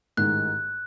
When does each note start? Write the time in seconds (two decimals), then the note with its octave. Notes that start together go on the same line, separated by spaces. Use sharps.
0.17 A1 G#2 D#3 F#6